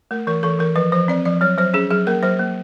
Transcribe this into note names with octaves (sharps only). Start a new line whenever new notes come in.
A3 A#4
E3 A#4
E3 A4
E3 A#4
F3 B4
F3 C5
C4 D5
F3 D5
F#3 C#5
F#3 C5
C#4 G#4
F#3 G#4
A#3 A#4
F#3 C5
A#3